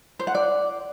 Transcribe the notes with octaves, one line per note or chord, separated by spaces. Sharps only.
C5
F#5
D5